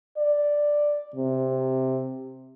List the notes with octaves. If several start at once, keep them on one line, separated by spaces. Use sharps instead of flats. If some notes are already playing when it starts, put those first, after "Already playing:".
D5
C3